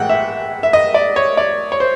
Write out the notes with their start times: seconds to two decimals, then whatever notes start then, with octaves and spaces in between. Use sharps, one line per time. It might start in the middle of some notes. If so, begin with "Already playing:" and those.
Already playing: A2 E3 G#3 F#5 G5
0.09 E5
0.63 E5
0.73 D#5
0.94 D5
1.16 C#5
1.37 D5
1.72 C#5
1.80 C5